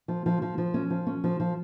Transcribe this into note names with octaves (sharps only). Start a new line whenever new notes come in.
F3
F3
F3
F3
C#4
F3
C#4
F3
F3